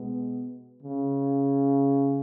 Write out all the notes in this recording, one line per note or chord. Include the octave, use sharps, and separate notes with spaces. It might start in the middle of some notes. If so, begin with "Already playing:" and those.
Already playing: B2 G#3 B3
C#3